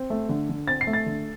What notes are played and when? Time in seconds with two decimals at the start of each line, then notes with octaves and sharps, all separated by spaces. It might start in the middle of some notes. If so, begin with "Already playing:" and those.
Already playing: C4
0.10 A3
0.29 D3
0.49 D3
0.67 C4 A6
0.81 C7
0.87 A3
0.93 A6
1.06 D3